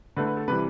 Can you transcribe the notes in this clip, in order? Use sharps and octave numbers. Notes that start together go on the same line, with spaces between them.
D3 A3 B4
B4
A4
C3 E3 G3 B4